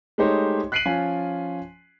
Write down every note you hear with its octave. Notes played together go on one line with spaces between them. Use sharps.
G#3 A3 D#4 G4 C5 C#5
F#6 B6 C7 D7 D#7 F#7
F3 C#4 F4 G#5